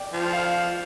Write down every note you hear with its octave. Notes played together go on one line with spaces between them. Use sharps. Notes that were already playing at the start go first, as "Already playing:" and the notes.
Already playing: D5 G5
F3
F5